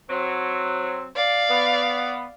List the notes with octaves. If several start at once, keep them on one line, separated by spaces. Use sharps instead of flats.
F#3 C4
D5 F5
B3